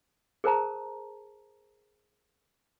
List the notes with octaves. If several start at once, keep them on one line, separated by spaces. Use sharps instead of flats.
G#4 A#4 C5 A5 A#5